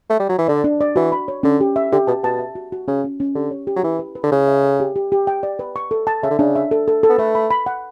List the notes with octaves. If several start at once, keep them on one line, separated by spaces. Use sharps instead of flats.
A3
G3
F#3
E3
D3 D5
D4
D5
E3 F#4
B5
C#5
D3 C#4
G4
E5
D3 G4
B2 A5
B2 A5
E5
F#4
F#4
C#3 C#4
C#4
C#4
D3 G4
C#5
G4
F#3
E3 E4
B4
B4
D3
C#3 E4
E5
A4
G4
G4
G4
G5
D5
B4
C#6
A4
A5
C#3 E5
D3
C#3 D4
E5
A4
A4
A4
B3
A3 B4
B5
B5
F#5